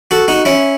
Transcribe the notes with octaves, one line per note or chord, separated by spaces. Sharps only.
F#4 A4
D#4 F#4
C#4 E4